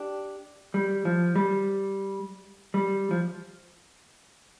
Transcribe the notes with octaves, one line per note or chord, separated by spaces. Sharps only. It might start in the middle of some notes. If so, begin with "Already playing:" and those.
Already playing: D4 G4
G3
F3
G3
G3
F3